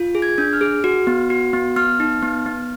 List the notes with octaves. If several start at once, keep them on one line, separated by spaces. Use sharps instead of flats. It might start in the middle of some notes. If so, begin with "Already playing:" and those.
Already playing: F4
G#4
G#6
D4
F6
G#4
F#4
B3
F#4
B3
B3 F6
D#4
B3
B3